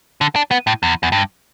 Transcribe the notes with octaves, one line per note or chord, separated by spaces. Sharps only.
D3
D4
B3
A2
E2
E2
G2